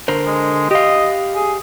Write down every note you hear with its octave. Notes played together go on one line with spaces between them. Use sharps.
D3 A#4 C5
G#3
G4 D#5 F5
G#4